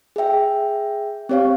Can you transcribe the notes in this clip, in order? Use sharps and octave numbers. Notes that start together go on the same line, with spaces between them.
G#4 E5 G5
C4 G4 C#5 F5